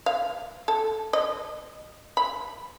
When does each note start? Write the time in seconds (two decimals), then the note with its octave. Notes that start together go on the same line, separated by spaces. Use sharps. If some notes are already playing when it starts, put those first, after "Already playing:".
0.06 F5
0.68 A4
1.13 D#5
2.17 B5